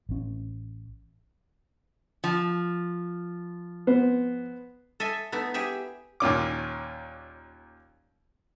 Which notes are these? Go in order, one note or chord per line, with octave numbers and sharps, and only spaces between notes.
A1 C#4
F3
B3 C5
A4 D#5 E5 G#5
A3 B3 D#4 E4
G4 G#4 E5
D#2 A#2 C#4 D6